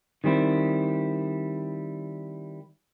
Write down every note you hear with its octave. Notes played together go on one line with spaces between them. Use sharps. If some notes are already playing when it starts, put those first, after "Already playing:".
D#3 G3 C4 E4